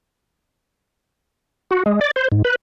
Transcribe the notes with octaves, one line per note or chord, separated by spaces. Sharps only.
F#4
G#3
D5
C5
G#2
B4